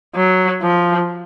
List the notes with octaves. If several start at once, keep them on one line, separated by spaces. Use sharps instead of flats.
F#3
F3